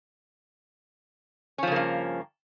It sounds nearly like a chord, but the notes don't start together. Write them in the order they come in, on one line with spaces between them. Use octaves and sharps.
C#4 F3 C#3 A#3 G2